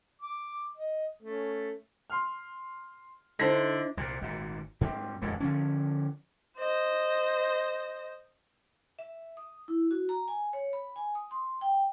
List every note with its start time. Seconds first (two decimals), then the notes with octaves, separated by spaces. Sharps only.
0.22 D6
0.77 D#5
1.23 A3 C#4
2.10 C6 F6
3.39 D3 D#4 E4 A4 C5 A#6
3.97 C2 A#2
4.22 G#1 A#2
4.81 G#2 G3 C4
5.22 D#1 F2 A2 G#3
5.40 D3 F3 C#4
6.58 C5 D#5
8.99 E5
9.37 D#6
9.68 E4
9.91 F#4
10.09 A#5
10.28 G#5
10.53 C#5
10.73 B5
10.96 G#5
11.15 D#6
11.31 C6
11.61 G5